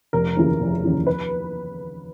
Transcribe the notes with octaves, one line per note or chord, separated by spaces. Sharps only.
F1 A#4
D#2 C#3 E3
F1
D#2 C#3 E3
B4